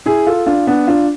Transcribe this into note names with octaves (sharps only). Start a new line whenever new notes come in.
E4 G#4
F4 A4
D4 F4
B3 D4
D4 F4